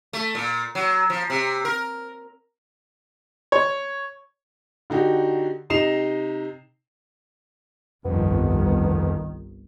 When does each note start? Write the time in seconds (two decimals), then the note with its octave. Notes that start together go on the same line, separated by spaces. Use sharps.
0.13 A3
0.35 A#2
0.75 F#3
1.10 F3
1.30 C3
1.65 A#4
3.52 C#5
4.90 D3 D#4 F#4 G4
5.70 C3 D#4 D#5 C7 E7 F7
8.05 G1 C2 F2 D#3 B3